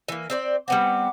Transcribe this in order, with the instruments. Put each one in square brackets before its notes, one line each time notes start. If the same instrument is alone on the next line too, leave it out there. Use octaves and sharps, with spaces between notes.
[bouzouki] E3 A#3
C4 C5 D5
[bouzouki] G3 B3 C4 [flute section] F#5 D6